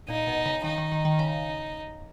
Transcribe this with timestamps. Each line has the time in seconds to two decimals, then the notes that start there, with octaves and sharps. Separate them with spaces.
0.08 A#2 D#4
0.27 B2
0.46 C#3
0.64 D#3 D#4
0.78 D#3
0.92 D#3
1.05 D#3
1.19 C#3